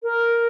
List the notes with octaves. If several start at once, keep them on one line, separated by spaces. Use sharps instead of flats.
A#4